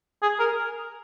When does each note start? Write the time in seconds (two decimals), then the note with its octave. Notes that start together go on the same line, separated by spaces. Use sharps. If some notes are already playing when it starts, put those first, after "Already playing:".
0.22 G#4
0.40 A#4